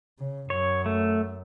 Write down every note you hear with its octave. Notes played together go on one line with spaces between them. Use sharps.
C#3
F#2 C#5
A3